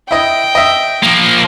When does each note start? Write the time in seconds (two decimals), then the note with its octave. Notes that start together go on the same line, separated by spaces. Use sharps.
0.11 E4 D#5 G5 D#6
0.55 D#5 E5
1.03 F3 A#3